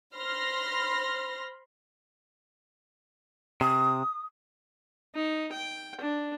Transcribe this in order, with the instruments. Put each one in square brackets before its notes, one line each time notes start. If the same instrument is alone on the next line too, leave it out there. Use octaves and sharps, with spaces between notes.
[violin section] C5 B5 C6 F6 A#6
[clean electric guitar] C3 [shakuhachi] D#6
[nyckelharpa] D#4
G5
D4